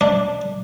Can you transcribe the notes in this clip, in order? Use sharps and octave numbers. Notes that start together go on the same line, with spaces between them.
D4